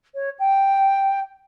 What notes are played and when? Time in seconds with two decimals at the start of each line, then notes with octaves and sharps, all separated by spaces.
0.14 C#5
0.39 G5